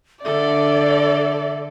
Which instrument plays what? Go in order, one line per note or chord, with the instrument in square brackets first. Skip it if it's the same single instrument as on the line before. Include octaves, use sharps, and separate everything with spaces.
[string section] D3 [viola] A4 [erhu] D5 [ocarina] E5